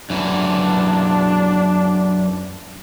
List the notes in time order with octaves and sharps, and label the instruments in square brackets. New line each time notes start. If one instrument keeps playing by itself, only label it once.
[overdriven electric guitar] F#2 E3 [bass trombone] D4